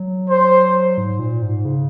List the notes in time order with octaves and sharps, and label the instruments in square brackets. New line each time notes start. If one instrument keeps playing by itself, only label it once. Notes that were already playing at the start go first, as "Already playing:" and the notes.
Already playing: [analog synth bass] F#3
[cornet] C5
[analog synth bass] G#2
A#2
G#2
C#3